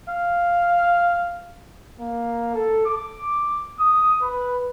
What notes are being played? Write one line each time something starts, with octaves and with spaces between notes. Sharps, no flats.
F5
A#3
A4
D6
D#6
B4